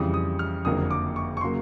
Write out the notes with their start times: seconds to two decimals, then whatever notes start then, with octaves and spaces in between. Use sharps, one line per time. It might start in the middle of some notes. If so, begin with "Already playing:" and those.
Already playing: F2 C#3 E3 G3 D#6
0.14 D#6
0.39 F6
0.65 F#1 F2 D3 F#3 A#3 D#6
0.91 D6
1.16 C#6
1.37 C#6
1.41 C#3 F#3 A#3 C6